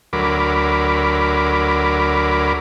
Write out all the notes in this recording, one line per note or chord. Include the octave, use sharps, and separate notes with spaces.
D2 F#3 A#4 B5 D6